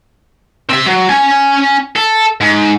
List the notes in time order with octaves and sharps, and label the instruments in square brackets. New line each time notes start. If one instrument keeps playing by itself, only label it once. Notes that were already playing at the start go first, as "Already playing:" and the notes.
[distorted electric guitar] C4 E5
F#3
C#4 G#5
A4
G#2